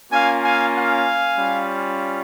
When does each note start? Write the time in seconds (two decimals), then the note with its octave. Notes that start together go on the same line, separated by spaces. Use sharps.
0.11 A#3 C#4 F4 F5 G#5
0.43 F5 G#5
0.75 F5 G#5
1.38 G3 C#4 F4